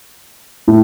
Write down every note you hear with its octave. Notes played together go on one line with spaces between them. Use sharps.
A2